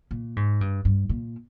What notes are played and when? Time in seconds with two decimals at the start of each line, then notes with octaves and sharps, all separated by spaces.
0.11 A#2
0.36 G#2
0.61 G2
0.85 G2
1.09 A#2